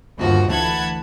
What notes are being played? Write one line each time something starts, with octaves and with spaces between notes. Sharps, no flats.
G1 D#2 F3 F#4
D2 E3 F#5 A5 B5 G#6